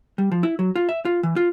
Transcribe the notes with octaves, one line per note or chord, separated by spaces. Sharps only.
G3
F3
E4
F#3
F4
E5
F4
E3
F4